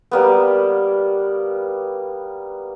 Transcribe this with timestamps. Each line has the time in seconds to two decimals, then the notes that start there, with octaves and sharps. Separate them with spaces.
0.11 G3 A#3 B3